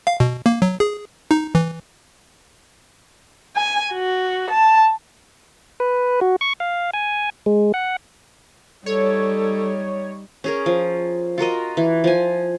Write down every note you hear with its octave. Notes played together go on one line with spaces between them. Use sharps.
F5
B2
A#3
F#3
G#4
D#4
E3
G#5
F#4
A5
B4
F#4
C#6
F5
G#5
G#3
F#5
G3 D#4 A4 C#5
C#4 G#4 A#4
F3
F4 F#4 A#4 D#5
E3
F3 G#5